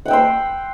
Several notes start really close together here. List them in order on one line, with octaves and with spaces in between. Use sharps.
F#5 G5 E6 C6